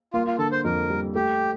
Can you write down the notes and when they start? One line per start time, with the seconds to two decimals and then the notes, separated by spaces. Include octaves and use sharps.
0.13 A#3 F4
0.27 F4
0.38 D3 A4
0.52 C5
0.64 F2 A#4
0.90 G3
1.15 A3 G4